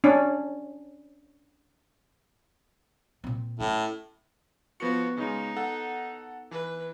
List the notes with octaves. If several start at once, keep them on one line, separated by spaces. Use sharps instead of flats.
C#4 D4
A#2 C4
A2 C#4
F3 B3 F#4 C#7
C#3 G#3 D#4
A4 F#5
E3 B4